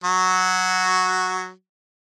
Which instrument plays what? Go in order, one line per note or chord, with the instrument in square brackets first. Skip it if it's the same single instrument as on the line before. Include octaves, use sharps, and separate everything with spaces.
[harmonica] F#3 F#4